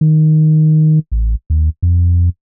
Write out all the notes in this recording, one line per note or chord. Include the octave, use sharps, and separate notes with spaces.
D#3
A1
D#2
F2